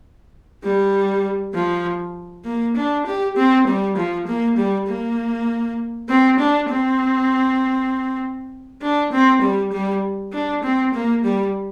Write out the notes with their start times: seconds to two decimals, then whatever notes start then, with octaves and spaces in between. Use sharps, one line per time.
0.64 G3
1.54 F3
2.45 A#3
2.76 D4
3.06 G4
3.36 C4
3.67 G3
3.96 F3
4.27 A#3
4.57 G3
4.87 A#3
6.09 C4
6.39 D4
6.70 C4
8.82 D4
9.12 C4
9.41 G3
9.72 G3
10.32 D4
10.63 C4
10.94 A#3
11.24 G3